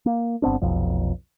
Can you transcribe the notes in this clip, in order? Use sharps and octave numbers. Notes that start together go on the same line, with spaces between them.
A#3
G1 B3 C4 D4
F1 B1 F2